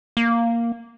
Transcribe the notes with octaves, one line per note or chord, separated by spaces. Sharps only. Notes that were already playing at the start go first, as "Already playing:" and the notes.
A#3